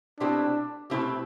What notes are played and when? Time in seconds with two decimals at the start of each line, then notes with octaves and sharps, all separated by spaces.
0.20 B2 A3 C4 D4 E4 G4
0.90 B2 A3 C4 E4 G4